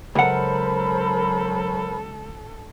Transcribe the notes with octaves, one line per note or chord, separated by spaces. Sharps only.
C#2 F#3 A4 A#4 C5 F#5 B5